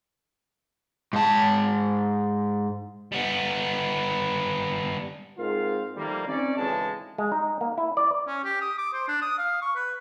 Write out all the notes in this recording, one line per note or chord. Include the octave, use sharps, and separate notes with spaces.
G#2 A5
G3 B3
G#2 C4 F4 A#4 F5
D#3 F3 G3 A3 A#3
C4 C#4 D#4 D5
G#1 A2 C#3 E3 G#3 A5
G#3
D#4
A#3
E4
D5
C#4
G4
D#6
D6
C5
D4
D#6
F5
C#6
B4